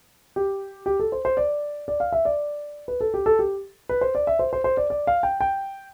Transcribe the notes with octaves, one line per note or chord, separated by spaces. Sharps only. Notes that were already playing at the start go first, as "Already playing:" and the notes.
G4
G4
A4
C5
C5
D5
D5
F5
E5
D5
B4
A4
G4
A4
G4
B4
C5
D5
E5
C5
C5
C5
D5
D5
F5
G5
G5